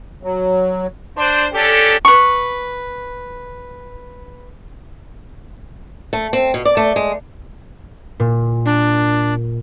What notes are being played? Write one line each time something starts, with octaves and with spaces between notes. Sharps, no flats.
F#3
D4 C5
C#4 D4 G4 A4
B4 C#6
A3
C4
B2
D5
A3
G#3
A#2
D4